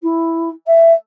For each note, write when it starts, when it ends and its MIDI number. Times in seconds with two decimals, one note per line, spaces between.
0.02 0.49 64
0.66 0.92 76